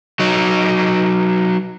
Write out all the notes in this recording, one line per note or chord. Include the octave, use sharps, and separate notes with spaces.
F#3 D#4